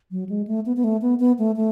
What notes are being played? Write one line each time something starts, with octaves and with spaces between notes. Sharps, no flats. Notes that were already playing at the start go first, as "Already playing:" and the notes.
F#3
G#3
A3
B3
B3
A3
B3
B3
A3
A3